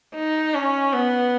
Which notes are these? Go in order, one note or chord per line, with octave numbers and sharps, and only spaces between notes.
D#4
C#4
B3